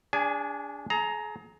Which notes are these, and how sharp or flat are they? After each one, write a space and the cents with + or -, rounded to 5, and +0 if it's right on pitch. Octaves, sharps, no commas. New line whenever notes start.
D4 -20 G#4 -25 G#5 +20
G#4 +35 A#5 +0